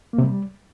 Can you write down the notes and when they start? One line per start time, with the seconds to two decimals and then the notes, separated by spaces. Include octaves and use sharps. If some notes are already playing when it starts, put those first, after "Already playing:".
0.13 A#3
0.18 C3
0.23 G3